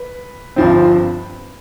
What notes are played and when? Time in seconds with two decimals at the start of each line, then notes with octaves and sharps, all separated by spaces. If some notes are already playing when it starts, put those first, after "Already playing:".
Already playing: B4
0.56 G1 G2 F3 C4